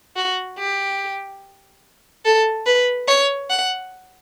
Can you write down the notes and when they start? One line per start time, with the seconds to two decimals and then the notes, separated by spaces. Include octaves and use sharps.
0.16 F#4
0.58 G4
2.25 A4
2.66 B4
3.08 C#5
3.50 F#5